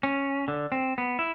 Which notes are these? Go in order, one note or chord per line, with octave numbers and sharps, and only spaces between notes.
C#4
D3
C4
B3
E4